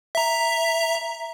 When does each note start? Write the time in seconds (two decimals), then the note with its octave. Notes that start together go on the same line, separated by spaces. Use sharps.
0.15 E5 A#5